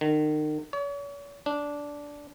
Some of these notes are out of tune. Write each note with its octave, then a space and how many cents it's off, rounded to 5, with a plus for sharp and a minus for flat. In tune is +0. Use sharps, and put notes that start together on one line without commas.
D#3 -35
C#5 +40
D4 -10